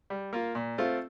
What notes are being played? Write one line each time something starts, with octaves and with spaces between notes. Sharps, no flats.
G3
A#3 F4
A#2
A3 C4 F4